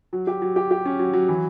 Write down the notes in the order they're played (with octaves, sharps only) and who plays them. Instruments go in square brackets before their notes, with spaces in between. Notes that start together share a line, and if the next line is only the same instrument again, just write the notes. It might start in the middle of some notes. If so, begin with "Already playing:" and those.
[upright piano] F#3
G4
F#3
G4
G4
C#4
F#3
F#3
E3